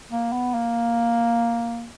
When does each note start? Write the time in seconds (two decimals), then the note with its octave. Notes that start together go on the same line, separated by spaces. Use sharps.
0.11 A#3
0.33 B3
0.54 A#3